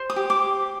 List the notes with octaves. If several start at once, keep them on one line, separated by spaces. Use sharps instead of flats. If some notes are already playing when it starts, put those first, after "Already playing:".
Already playing: C5
D#6
G4
D6